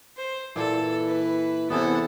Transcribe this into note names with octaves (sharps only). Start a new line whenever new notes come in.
C5
A#2 E3 A4
B4
E2 C3 E3 B3 A4 F#5